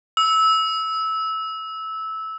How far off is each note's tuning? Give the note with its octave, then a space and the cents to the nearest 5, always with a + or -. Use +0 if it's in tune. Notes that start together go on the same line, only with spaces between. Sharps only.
E6 -15